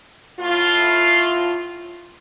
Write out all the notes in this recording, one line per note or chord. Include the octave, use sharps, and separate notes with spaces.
A2 F4